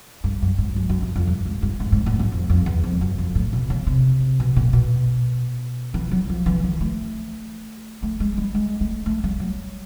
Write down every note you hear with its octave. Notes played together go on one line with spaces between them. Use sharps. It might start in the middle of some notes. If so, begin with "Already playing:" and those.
G2
F#2
G#2
F#2
F#2
F#2
F2
G2
G#2
G2
G#2
G#2
A2
F#2
F2
F2
E2
F2
F#2
F2
A2
B2
C#3
C3
B2
A#2
B2
E3
F#3
F3
E3
D#3
A3
A3
G#3
G3
G#3
A3
A3
G3
F#3